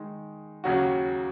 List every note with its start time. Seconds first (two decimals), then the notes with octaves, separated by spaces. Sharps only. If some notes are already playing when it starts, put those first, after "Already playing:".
Already playing: D#3 G#3 D#4
0.64 D#2 C#3 F#3 C#4 F#4